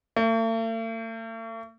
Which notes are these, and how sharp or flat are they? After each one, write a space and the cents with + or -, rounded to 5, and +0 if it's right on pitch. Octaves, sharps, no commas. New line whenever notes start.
A3 +45